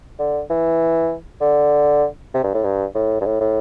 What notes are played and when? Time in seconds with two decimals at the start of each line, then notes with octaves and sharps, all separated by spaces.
0.19 D3
0.50 E3
1.41 D3
2.34 C3
2.43 G2
2.54 A2
2.64 G2
2.95 A2
3.21 G2
3.26 A2
3.40 A2